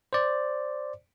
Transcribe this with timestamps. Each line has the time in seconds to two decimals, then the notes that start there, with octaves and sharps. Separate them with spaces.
0.13 C5 D5